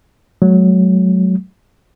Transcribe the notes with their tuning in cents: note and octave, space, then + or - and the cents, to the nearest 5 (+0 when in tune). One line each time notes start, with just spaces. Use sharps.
F#3 +5 A3 -45